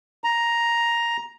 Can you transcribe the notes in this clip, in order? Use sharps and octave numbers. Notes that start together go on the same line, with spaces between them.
A#5